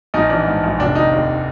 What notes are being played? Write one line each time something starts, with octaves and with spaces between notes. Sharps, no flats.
A#1 D#4
E3 D4
G#2
A#1
F1 D4
D#3 D#4
D#2